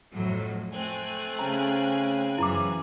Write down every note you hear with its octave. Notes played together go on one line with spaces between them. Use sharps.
F2 A2 F#3
A3 C4 G#5 F#6
C#3 C#4 A#5
F#2 E3 E4 A#5 D6